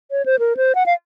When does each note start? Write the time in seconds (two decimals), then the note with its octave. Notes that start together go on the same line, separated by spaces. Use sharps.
0.11 C#5
0.26 C5
0.39 A#4
0.57 C5
0.75 F#5
0.86 F5